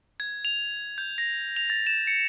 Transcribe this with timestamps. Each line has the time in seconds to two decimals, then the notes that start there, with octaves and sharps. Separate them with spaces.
0.20 G#6
0.45 F7
0.98 G6
1.18 A#6
1.56 F7
1.70 A6
1.87 E7
2.07 C#7